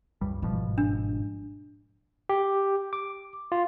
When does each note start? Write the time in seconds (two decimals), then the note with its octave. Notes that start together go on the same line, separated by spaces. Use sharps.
0.21 C#2 G2 G3
0.42 G1 G#2 B2 F3
0.78 D4
2.29 G4
2.93 D6
3.52 F4